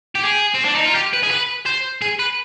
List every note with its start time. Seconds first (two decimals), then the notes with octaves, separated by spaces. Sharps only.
0.15 G4
0.25 G#4
0.54 C4
0.65 D4
0.75 D#4
0.85 F4
0.95 G4
1.13 B4
1.23 G#4
1.31 B4
1.66 C5
2.02 G#4
2.19 B4